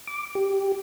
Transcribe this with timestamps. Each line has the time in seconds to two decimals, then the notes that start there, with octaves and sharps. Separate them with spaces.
0.07 D6
0.35 G4